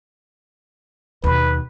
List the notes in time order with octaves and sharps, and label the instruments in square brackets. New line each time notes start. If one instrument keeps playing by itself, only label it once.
[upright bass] D#2 B2 [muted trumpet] B4